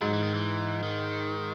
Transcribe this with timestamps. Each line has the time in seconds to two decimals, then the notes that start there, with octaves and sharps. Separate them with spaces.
0.02 G#2 F#3
0.13 E3
0.23 D#3
0.34 E3
0.83 D#3